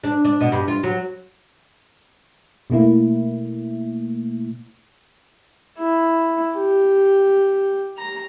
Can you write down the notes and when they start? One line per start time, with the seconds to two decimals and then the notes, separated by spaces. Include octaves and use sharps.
0.04 D4
0.25 D4
0.41 B2
0.52 G2
0.68 F4
0.83 F#3
2.70 B2 A3 A#3 E4
5.77 E4
6.55 G4
7.97 A#5